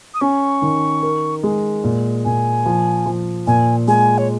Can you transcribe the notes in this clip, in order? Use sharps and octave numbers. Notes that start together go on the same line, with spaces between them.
D#6
C#4 C#6
D#3
A#4
G#3
A#2
A#2 G#5
F3
F3
A#2 G#5
G#3 G#5
C#5